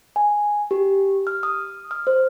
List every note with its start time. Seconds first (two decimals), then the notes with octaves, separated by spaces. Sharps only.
0.16 G#5
0.71 G4
1.27 F6
1.43 D#6
1.91 F6
2.07 C5